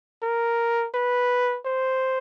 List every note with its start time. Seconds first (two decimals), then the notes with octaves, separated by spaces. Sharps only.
0.23 A#4
0.94 B4
1.65 C5